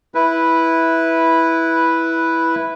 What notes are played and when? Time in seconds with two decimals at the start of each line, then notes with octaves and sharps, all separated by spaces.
0.15 E4 B4